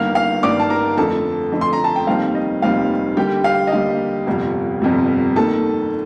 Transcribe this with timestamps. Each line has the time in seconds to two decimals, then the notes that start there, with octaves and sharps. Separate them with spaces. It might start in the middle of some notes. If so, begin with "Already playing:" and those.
Already playing: G1 G2 D#3 A#3 F5 F6
0.15 F5 F6
0.43 G1 G2 D#3 A#3 D5 D6
0.59 A5
0.70 A#4 A#5
0.97 F2 D3 A3 A4 A5
1.52 F2 D3 A3
1.61 C6
1.73 A#5
1.84 A5
1.96 G5
2.07 F1 D#2 D#3 G3 C4 F5
2.35 D#5
2.62 F1 D#2 D#3 G3 C4 F5
3.17 D#2 D3 G3 A#3 G4 G5
3.44 F5
3.67 D#5
3.72 D#2 D3 G3 A#3 F5
4.27 G1 F2 C3 G3
4.82 G1 F2 C3 G3
5.36 D#2 D#3 A#3 A4 A5